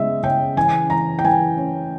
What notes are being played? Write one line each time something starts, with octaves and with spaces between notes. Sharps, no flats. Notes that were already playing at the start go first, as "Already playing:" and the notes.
Already playing: C#3 G#3 B3 D#5 E5
C#3 G5
E3 G#5
E3 A#5
G5
E3 G#5
C#4